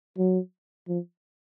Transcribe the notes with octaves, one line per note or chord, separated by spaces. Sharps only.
F#3
F3